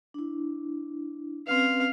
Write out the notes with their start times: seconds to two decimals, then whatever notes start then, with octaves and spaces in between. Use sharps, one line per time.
0.14 D4 E4
1.47 C4 C#4 B4 F5